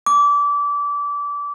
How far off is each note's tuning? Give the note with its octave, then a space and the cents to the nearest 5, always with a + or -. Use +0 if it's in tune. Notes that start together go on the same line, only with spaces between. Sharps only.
D6 -25